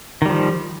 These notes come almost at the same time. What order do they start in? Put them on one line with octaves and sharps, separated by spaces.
D#3 G3 F3